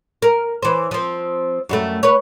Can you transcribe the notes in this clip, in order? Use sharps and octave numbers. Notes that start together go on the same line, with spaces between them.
A#4
E3 C5
F3 C4
F#2 G3 A3
B4 C#5